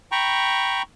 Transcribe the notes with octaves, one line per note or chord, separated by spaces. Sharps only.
G5 A#5 B5 C#6